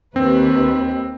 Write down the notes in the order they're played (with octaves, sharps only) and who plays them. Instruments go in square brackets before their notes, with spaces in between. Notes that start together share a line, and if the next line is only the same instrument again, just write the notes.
[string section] D#2 B4 [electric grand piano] C4